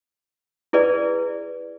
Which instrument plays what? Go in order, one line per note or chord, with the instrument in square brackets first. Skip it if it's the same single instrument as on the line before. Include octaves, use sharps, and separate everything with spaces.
[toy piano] E4 G#4 B4 D5